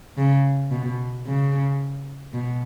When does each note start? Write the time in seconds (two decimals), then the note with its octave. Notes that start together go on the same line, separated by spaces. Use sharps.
0.18 C#3
0.71 B2
1.27 C#3
2.34 B2